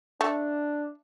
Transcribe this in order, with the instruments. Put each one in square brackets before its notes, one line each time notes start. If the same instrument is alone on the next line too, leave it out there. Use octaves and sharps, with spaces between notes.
[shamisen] A3 [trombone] D4